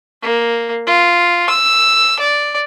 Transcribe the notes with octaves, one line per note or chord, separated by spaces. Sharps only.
A#3
F4
E6
D5